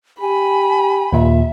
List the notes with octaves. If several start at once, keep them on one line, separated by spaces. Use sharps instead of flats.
G4 G#5 B5
D#2 A#2 E5